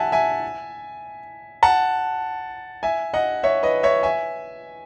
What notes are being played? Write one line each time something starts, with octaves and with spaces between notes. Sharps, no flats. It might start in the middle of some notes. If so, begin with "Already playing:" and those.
Already playing: E5 F#5 G#5 A5
E5 G#5
F#5 A5
E5 G#5
D#5 F#5
C#5 E5
B4 D#5
C#5 E5
E5 G#5